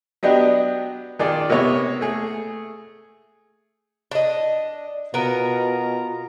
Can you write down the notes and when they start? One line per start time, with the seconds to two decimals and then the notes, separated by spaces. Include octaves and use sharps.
0.23 F#3 B3 D4 G4 D#5
1.19 D#3 F4 G#4 D5
1.49 C3 A#3 B3 C#5
2.01 A3 G#4
4.11 D4 D#5
5.14 B2 B3 F4 A#4 A#5